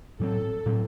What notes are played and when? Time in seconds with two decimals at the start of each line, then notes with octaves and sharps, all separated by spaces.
0.20 A2 F#3 C4 A4
0.66 A2 F#3 C4